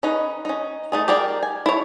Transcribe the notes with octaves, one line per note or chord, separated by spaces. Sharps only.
C#4 D#4 B4
C#4 D#4
A3 D#4 G#4
G4 G#4 A#4 D5 G5
G#5
E4 C#5